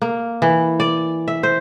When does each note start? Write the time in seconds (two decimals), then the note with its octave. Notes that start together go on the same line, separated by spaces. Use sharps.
0.02 A#3
0.42 E3
0.80 D5
1.28 E5
1.43 C5